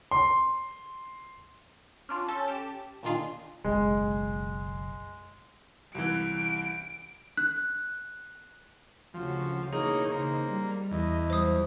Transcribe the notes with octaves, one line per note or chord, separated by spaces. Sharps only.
C6
C#4 D4 F4
C#4 A4 A5 G6 E7
G4 A5
A#2 D#3 D4 F4 G#4
F#1 B1 G#3
C2 E3 D7
F#6
D2 C#3 F3 F#4
B2 E3 A#3 D#4 G#4 C#5
C#3 A#3 D#4 C5
G3
E2 D#5
F#3 G3 C5 D#6